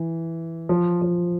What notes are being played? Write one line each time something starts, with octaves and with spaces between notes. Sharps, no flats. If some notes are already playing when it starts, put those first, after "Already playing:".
Already playing: E3
F3
F3